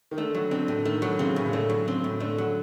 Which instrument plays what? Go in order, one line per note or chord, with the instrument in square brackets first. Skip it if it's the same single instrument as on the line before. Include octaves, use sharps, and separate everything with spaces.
[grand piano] D#3
[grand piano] D3 [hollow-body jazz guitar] A3
[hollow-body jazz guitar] F#3
[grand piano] D3 [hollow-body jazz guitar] C4
[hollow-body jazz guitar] A2
[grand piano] D#3 [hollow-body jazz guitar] A3
[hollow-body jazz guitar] F#3
[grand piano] C#3 [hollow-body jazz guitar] C4
[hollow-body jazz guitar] A2
[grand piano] C#3
[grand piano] D3 [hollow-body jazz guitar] A3
[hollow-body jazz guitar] F#3
C4
A2
[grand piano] D3 [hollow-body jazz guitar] A3
[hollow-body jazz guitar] F#3